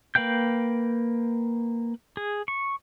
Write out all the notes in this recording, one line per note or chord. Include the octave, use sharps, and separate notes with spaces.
A#3 B4 F5 G5 G6
G#4
C#6